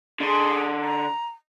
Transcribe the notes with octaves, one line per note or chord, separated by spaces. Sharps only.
D3 G#4 C6
A#5